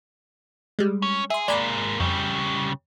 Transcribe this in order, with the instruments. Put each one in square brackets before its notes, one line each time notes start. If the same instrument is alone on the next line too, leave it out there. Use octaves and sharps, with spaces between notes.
[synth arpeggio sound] G3 G#3
[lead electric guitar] C#4
[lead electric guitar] G#4 [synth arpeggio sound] E5 C6
[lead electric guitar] G#3 A#3 [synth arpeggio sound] D5 G#5 B5
[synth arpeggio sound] F2 [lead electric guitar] C#3 G3